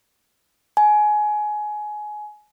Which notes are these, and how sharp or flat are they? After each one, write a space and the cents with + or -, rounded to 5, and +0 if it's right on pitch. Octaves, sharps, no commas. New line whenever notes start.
G#5 +20